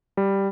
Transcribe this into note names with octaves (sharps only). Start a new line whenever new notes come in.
G3